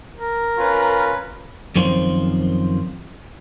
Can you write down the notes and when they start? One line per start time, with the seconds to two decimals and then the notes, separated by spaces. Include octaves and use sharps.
0.17 A#4
0.59 C#4 F4 B4
1.76 F#2 D#3 F3 C4